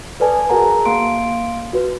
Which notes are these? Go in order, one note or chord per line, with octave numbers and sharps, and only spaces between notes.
A4 B4 D5 G#5 A5
F#4 G#4 A#4 F#5 A5 A#5
A#3 F5 C6 D7
F#4 B4